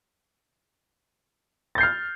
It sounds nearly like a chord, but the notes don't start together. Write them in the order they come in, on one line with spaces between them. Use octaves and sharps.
A6 G6 C7 F6